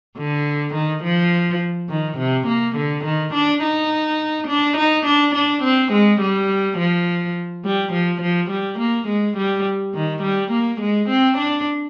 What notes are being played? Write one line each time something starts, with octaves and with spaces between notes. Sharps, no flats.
D3
D#3
F3
D#3
C3
A#3
D3
D#3
D4
D#4
D4
D#4
D4
D4
C4
G#3
G3
F3
G3
F3
F3
G3
A#3
G#3
G3
D#3
G3
A#3
G#3
C4
D4